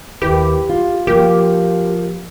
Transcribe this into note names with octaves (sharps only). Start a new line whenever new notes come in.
D#2 E4 G4 B4
F4
F3 A#3 G4